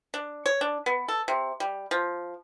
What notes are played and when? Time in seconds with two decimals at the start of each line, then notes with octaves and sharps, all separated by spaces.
0.14 D4
0.46 C#5
0.61 D4
0.86 B3
1.08 A4
1.28 C3
1.60 G3
1.91 F3